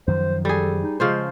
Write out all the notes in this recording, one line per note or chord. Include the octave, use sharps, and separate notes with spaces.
F#2 D#3 F3 C5
G3 G#4 A4
D#4
C#3 F3 G#3 C5